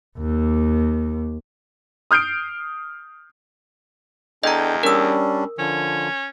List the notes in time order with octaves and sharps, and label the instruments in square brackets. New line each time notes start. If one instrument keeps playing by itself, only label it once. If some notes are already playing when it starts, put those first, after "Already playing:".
[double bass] D#2
[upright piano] D#6 F6 G6 C7 D7
[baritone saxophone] E2 [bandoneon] D4 A4 G5 [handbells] D#5 A#5
[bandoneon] G3 C#4 D4 [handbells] A#4 E6
[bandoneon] D3 F3 [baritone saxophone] C#4